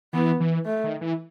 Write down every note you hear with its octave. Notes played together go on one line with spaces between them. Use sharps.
E3 B3
E3
A3
D#3
E3